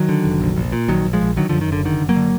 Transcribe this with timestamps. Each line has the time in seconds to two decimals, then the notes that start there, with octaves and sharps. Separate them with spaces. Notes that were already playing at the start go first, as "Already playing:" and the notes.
Already playing: D#3 F#3
0.09 D3
0.25 F1
0.41 A#1
0.56 A#1
0.72 A#2
0.88 A#1 D#3 F#3
1.05 A#1
1.13 F3 G#3
1.21 A#1
1.37 D3 D#3 F#3
1.49 F#2 D3 F3
1.61 D#3
1.69 F#1 D3
1.85 D3 D#3
2.00 F#1
2.09 F#3 A#3
2.16 D3